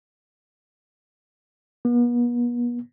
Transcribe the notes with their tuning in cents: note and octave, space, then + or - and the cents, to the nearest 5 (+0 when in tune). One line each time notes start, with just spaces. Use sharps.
B3 -40